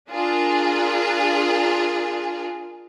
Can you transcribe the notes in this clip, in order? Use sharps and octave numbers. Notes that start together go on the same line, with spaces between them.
D4 F4 G#4 A#4